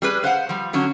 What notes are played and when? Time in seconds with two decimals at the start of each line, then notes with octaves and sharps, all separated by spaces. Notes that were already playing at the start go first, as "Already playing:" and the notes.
0.02 G3 G#4 B4
0.24 C5 F5 F#5
0.49 F3 G3
0.73 D3 F#3 C#4